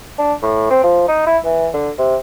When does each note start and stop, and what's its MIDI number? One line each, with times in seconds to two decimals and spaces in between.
0.19 0.34 62
0.42 0.68 45
0.70 0.81 60
0.83 1.03 53
1.08 1.26 63
1.26 1.37 64
1.44 1.68 52
1.74 1.90 50
1.99 2.16 48